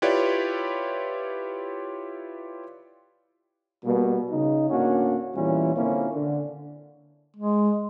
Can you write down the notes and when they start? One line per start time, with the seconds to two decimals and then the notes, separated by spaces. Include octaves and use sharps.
0.02 E4 F4 G4 B4 C#5 D5
3.84 B2 G3 A#3
4.31 C#3 D#4
4.70 D2 A2 A#3 C#4 D4 F#4
5.35 E2 A#2 E3 G3 C#4 E4
5.75 A#2 D3 A#3 C4 C#4 E4
6.14 D3
7.37 G#3